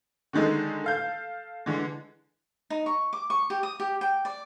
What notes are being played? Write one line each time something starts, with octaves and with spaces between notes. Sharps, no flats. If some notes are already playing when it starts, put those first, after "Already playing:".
D3 D#3 G#3 D#4 A4
A4 F5 G6
D3 E3 G#3
D#4
C#6
D6
C#6
G4
D#6
G4
G5
D5